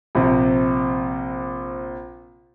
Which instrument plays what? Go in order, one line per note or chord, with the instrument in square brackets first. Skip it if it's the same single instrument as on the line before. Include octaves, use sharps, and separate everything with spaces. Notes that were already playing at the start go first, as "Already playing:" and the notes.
[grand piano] A#1 C3